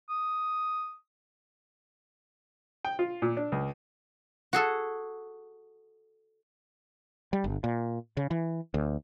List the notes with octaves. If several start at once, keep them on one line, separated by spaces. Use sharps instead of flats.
D#6
G5
F4
A#2
D4
C#2
F#4 G#4 A4
G3
G1
A#2
C#3
E3
D2